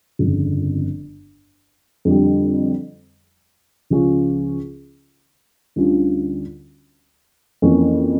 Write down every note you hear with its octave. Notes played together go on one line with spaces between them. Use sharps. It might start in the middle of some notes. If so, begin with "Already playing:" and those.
G1 F2 C#3
F2 D3 G3
C#2 C#3 F3 C#4 F4
D2 D3 G3 C#4 F4
F2 E3 A#3 C#4